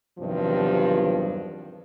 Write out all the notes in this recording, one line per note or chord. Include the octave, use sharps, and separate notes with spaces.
E2 G2 C3 D#3 F3 F#3